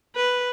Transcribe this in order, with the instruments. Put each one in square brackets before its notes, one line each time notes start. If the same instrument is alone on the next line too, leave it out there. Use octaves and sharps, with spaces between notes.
[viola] B4